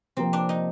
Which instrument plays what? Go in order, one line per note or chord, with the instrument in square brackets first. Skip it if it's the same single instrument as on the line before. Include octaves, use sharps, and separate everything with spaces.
[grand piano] C3 F3 A#3 [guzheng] C4
[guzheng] D4
D#4